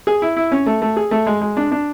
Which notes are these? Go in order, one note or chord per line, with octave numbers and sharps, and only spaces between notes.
G#4
E4
E4
C#4
A3
A3
G#4
A3
G#3
G#3
D4
D4